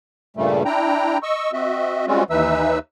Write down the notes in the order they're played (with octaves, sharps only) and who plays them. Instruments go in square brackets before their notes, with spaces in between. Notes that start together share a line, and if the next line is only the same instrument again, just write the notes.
[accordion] G2 A#2 C#3 G3 A3
D4 E4 G5 A#5
D#5 C#6 E6
C4 F#4 D#5 E5
G3 G#3 C4 C#4 F4 F#4
D#2 E3 D#4 B4 E5 E6